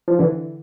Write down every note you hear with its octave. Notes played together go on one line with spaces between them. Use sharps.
F3
D3 E3